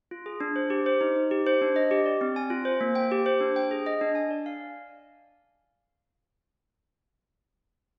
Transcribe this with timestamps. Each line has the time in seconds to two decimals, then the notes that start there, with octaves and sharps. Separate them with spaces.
0.11 F4
0.26 G#4
0.40 D4
0.56 C5
0.70 G4
0.86 C5
1.01 D#4
1.16 D#4
1.31 G4
1.46 C5
1.61 D4
1.76 D#5
1.91 G4
2.06 D5
2.21 C4
2.36 G#5
2.50 F4
2.65 C5
2.81 A#3
2.95 G5
3.11 G4
3.26 C5
3.41 D4
3.56 G5
3.71 G#4
3.86 D#5
4.01 D4
4.15 G#5
4.31 D5
4.46 F5